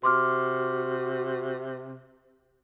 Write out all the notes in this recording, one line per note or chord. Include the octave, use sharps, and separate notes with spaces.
C3 F#4 C6 D6 F6